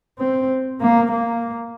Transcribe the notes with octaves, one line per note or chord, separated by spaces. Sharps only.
C4
A#3
A#3